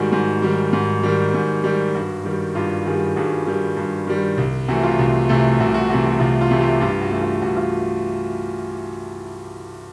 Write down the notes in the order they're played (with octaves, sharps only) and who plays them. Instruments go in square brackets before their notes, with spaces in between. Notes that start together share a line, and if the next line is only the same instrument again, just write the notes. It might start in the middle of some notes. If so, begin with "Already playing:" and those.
Already playing: [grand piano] G#2 D#3 G3 F#4 G#4
G#2
D#3 G3
G#2
D#3 G3
G#2
D#3 G3
G2 F#4
D#3 G3
G2 F4 G4
D#3 G3 F#4 G#4
G2 F#4 G#4
D#3 G3
G2
D#3 G3
C2
C3 E3 A3 F#4
F4
C2
C3 E3 A3
C2 F#4
F#4
C3 E3 A3 F#4
F#4
C2 F4
F4
C3 E3 A3
F4 G4
G2 F4 G4
F#4
E3 A3
F4
G2 F#4
F4